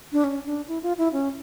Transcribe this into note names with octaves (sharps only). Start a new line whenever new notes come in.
D4
C#4
D4
E4
F4
E4
C#4